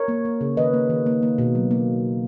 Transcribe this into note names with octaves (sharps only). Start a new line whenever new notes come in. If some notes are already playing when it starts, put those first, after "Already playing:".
Already playing: A#4 C#5
A#3
A#3
C#3
D#3 B4 D#5
A#3
D#3
A#3
A#3
B2
F#3
A#3